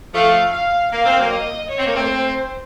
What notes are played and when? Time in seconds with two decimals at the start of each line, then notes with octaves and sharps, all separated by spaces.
0.14 F3 A3 F5
0.53 F5
0.92 A#3 F5
1.05 C4
1.19 F#3 A#3
1.31 D#5
1.70 C#5
1.78 C4
1.86 A#3
1.94 A3 C4
2.08 C5